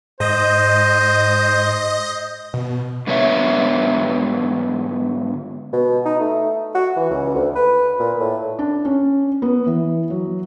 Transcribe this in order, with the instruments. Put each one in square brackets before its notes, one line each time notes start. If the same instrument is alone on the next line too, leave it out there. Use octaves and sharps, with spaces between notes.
[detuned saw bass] G#2 [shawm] C5 [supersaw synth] D#5
[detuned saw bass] B2
[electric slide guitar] G#2 D3 B3 G#4 C#5 E5
[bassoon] B2
D#4
A3
F#4
E3
C#2
D2
B4
A#2
A2
[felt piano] D4
C#4
B3
E3
F#3